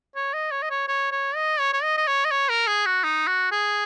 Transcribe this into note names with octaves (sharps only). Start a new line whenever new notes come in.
C#5
D#5
C#5
D#5
C#5
C#5
C#5
D#5
C#5
C#5
D#5
D#5
C#5
D#5
C#5
A#4
G#4
F#4
D#4
F#4
G#4